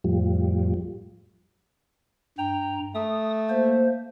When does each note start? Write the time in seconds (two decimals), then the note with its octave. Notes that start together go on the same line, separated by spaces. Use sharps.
0.04 F2 A2 F3 G3
2.38 G2 G5 A#5
2.95 A3 D#6
3.49 A#3 C5